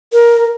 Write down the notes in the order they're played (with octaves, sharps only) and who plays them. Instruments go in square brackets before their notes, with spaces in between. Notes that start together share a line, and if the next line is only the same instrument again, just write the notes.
[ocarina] A#4